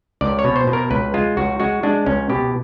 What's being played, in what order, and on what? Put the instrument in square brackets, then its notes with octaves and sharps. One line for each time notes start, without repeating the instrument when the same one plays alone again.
[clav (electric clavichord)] C#2 D5
C#5
B2
C5
B2
A#4
C#2 B4
G#3 F4
C#2 F#4
G#3 F#4
G#3 D4
C#2 C#4
B2 G4